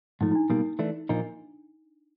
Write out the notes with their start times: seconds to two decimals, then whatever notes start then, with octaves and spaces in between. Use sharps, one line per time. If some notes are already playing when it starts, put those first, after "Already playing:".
0.21 G#2 F3 A3 D#4
0.31 D#4
0.35 D4
0.50 B2 G3 A#3 D#4
0.79 E3 A3 D4
1.09 A#2 F3 A#3 D4 D#4